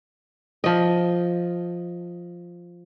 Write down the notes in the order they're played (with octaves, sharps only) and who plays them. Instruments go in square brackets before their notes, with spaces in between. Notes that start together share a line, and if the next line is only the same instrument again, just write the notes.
[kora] F3 D#5